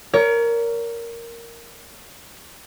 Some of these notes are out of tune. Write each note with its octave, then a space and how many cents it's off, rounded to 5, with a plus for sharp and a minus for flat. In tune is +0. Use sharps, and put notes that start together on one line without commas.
A#4 +0 C#5 +35